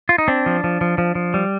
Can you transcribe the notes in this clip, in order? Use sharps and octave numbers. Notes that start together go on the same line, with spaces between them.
F4
D#4
C4 D4
F3
F3
F3
F3
F3
G3